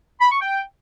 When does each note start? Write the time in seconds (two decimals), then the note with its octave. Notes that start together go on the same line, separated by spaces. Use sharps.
0.21 B5
0.31 C#6
0.41 G5